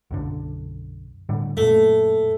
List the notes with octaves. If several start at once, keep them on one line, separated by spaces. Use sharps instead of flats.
B1 F#2 D3
A2 D3 G3
F#2 A#2 A3